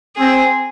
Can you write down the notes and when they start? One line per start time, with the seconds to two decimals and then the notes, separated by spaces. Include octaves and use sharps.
0.17 C4 G#4